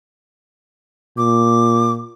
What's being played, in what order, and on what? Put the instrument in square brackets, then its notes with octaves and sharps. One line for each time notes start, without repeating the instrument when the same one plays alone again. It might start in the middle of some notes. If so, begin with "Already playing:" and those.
[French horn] A#2 [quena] D6